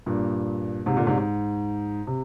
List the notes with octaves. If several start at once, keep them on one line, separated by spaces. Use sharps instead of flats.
G2 A#2
G#2 C3
A#2 D3
G#2 C3
G#2
C3